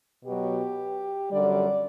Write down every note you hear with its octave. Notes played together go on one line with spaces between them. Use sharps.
B2 F#3 G4
F#2 D3 G3 D5